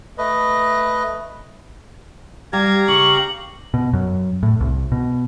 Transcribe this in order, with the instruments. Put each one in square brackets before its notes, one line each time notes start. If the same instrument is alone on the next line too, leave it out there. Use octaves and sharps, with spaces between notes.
[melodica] A3 B4 D#5
[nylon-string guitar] G3 [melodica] G4 F5 A#5 [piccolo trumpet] G#6
[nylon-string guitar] C#3 [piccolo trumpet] C#6 [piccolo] F#7
[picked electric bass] B2
F#2
A2
C2
B2